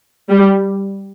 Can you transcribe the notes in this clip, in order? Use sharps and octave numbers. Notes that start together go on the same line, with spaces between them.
G3